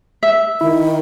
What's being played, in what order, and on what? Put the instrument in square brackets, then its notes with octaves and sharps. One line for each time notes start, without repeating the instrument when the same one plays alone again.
[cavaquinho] E5
[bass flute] D#3 [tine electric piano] E4